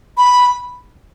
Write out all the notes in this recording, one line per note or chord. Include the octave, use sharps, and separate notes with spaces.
B5